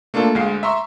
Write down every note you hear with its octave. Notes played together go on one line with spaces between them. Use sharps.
A3 A#3 D4 F4 A4
D2 G#3 F5 C7
E5 A#5 C6 C#6 E6